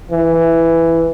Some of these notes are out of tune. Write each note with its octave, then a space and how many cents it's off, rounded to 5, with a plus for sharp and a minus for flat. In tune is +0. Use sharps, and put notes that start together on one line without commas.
E3 +5